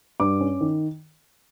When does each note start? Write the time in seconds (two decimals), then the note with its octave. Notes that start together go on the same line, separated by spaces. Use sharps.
0.20 G2 D6
0.41 C#4
0.61 D#3